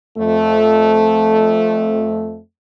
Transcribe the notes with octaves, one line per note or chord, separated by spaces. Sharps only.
F2 A3